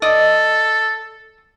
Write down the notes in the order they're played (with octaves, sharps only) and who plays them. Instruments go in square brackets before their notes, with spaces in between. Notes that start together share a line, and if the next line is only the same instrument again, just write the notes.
[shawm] A4 [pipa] D5 D#5